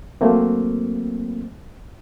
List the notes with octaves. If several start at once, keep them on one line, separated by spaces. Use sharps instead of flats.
F#3 A3 A#3 C4